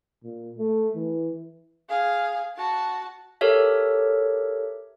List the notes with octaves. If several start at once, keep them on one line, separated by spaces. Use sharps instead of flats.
A#2
A3
E3
G#4 F5
F#4 A5
G4 A4 A#4 C#5 E5